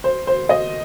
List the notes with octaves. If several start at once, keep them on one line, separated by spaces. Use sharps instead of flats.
C5
C5
D#5